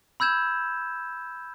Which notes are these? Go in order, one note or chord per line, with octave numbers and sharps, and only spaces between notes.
B5 E6 G6 G#6 E7